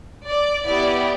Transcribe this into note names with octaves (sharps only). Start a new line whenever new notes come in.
D5
B3 E4 G4 D5